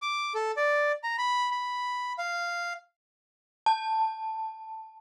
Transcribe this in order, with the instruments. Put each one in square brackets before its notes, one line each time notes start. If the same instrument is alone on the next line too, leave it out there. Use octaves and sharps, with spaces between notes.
[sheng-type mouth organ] D6
A4
D5
A#5
B5
B5
F5
[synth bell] A5